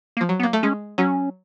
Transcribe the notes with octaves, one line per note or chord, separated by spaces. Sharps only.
A#3
F3
F#3
B3
A#3
A3
G#3 C#4
F#3 C#4